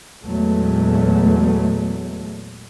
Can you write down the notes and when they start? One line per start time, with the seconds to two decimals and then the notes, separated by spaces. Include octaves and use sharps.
0.23 E2 A#2 F#3 G#3 A3